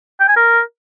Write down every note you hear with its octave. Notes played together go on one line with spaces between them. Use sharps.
G5
G#5
A#4